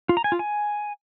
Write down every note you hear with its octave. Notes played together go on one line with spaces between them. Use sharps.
F4
A#5
G#5
F4
G#5